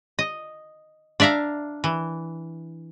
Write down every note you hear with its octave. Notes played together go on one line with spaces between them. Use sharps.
D#5
D4 D5 E5 F5 A#5
E3